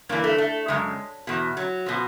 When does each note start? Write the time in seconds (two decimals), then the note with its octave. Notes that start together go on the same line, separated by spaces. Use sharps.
0.09 G2 E3 A#3
0.24 A3
0.38 A3
0.68 F#2 C#3 G#3
1.27 E2 B2
1.57 F#3
1.86 B2 F3